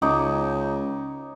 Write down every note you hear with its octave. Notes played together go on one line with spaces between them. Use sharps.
C#2 D#4 C#5 D6